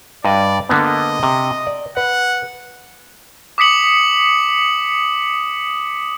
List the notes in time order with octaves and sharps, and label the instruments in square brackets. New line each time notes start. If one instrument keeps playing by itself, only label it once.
[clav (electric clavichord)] G2 D#5 [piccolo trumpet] D5
[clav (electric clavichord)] D3 A#3 B3 [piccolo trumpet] D#5
[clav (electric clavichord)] C3
D5
[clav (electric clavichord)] B4 [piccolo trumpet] F#5
[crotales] D6 D#6 B6 C#7 F#7